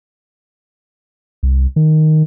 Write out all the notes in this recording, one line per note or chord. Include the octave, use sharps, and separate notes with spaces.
C2
D#3